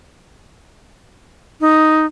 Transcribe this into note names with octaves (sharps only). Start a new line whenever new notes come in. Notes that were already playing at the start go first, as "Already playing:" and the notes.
D#4